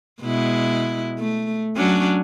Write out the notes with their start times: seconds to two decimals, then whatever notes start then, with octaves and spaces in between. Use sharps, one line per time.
0.22 B2 G#3 E4
1.19 A3
1.76 F#3 C#4 D4